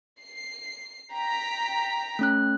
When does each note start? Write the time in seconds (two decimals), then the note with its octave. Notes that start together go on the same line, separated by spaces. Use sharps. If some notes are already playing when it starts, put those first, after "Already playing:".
0.21 C7
1.13 G5 A#5 B6
2.19 A3 C#4 F#6